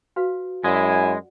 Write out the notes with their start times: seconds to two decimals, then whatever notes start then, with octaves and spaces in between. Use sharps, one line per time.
0.16 F#4 B4 F5
0.64 F#2 G#3 E4 D5 F#5 G#5